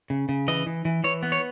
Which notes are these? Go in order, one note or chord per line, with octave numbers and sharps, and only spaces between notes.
C#3
C#3
E3 D#5
E3
E3
E3 C#5
B3
C#5